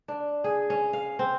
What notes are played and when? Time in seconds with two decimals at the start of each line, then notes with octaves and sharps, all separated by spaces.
0.08 D4
0.44 G#4
0.70 C#4
0.93 F5
1.19 C4